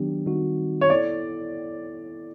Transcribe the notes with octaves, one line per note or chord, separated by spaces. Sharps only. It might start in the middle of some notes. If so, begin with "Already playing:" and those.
Already playing: D#3 F#3 B3 D4 G4
D#3 G3 C4 D#4 F#4
C#5
B3 E4 A4 D5